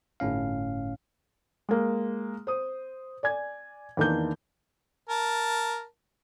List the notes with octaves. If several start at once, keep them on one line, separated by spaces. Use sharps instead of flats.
G1 A2 C#4 F5
G#3 A#3
C5 D#6
D5 G#5 G#6
E2 D#3 A#3 D4 A#4 G6
A#4 A5